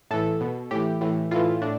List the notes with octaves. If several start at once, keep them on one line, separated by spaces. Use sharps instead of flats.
A2 E3 A4
B2
A2 E3 G4
A2 E3
A2 E3 F4
A2 D4